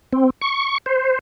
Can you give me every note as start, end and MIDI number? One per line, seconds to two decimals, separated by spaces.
0.13 0.30 60
0.41 0.78 85
0.86 1.19 72